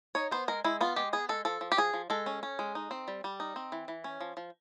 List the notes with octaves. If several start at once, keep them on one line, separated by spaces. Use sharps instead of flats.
D#4 C#5
B3 C5
G#3 A#4
G#3 E4
B3 F4
G#3 G4
B3 G#4
G#3 A4
F3 A4
F3
G4
F3 G#4
F3
G#3 A4
C#4
C#4
G#3
D#4
C4
G3
G3
D#4
C4
E3
E3
C#4
F3
F3